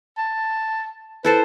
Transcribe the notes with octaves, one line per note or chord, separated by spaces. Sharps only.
A5
E4 A4 B4 C5